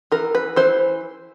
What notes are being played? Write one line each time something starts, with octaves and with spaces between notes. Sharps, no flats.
E3 A#4
B4
E3 C5